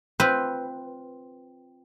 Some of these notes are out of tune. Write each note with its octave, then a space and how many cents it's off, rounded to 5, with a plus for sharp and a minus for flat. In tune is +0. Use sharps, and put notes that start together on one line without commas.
C4 +0 F4 +0 B4 +0